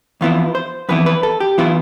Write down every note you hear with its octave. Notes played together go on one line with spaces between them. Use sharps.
F2 E3 B3 E4 F4
C5
F2 E3 B3 E4 B4
B4
A4
G4
E3 B3 E4 F4